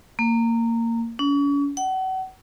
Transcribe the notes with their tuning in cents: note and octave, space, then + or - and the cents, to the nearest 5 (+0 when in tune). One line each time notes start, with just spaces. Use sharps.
A#3 -20
C#4 +40
F#5 +35